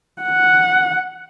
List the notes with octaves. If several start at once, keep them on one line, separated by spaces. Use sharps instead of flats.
F#5